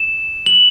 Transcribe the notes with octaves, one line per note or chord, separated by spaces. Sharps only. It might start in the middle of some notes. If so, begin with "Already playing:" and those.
Already playing: E7
F#7